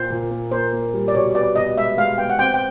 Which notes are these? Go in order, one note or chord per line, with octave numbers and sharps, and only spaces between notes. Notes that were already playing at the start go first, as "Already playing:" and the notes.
Already playing: A#2 C5
A#2
A#3
A#3 C5
A#3
G3
D5
B2 C#5
B3 D5
B2 D#5
G#3 E5
G#3 F5
B3 G5
F#5
C4 G5
G5